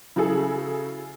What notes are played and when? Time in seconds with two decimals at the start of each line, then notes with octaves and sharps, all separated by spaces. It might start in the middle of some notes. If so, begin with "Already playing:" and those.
0.16 C#3 F#3 E4 G#4 A4